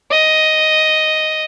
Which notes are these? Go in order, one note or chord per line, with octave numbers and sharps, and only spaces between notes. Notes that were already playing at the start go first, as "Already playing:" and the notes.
D#5